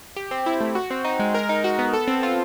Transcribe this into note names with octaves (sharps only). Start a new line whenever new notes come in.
G4
C4
E4
A3
F#4
C4
D#4
G#3
A#4
D#4
F#4
B3
A4
C4
F4